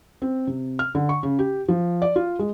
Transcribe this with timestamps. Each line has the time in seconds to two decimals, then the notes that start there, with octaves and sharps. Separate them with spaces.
0.22 C4
0.47 C3
0.79 F6
0.95 D3
1.09 C#6
1.23 C#3
1.39 G4
1.68 F3
2.02 D5
2.16 F4
2.39 G#3